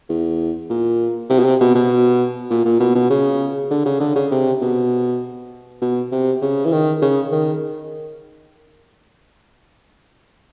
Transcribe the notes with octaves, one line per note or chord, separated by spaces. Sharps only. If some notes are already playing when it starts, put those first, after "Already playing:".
E2
A#2
C3
B2
C3
B2
B2
A#2
A#2
B2
B2
C#3
D3
C#3
D3
C#3
C3
B2
B2
C3
C#3
E3
D#3
C#3
D#3